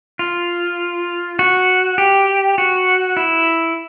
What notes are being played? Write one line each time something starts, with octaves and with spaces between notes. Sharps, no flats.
F4
F#4
G4
F#4
E4